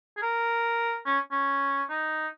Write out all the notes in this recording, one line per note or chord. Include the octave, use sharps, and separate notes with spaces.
G#4
A#4
C#4
C#4
D#4